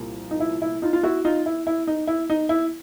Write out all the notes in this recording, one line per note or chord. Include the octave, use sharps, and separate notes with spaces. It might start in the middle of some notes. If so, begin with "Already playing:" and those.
Already playing: C2 A#2 F3
D#4
E4
E4
D#4 F4
F4
E4 F#4
D#4 F4
E4
E4
D#4
E4
D#4
E4